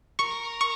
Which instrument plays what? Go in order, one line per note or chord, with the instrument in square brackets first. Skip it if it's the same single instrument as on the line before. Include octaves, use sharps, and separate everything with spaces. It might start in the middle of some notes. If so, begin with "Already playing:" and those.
[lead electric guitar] A#4 [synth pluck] C#6
[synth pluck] C#6